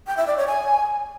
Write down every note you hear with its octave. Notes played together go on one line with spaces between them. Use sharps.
G5
E5
D5
C#5
G#5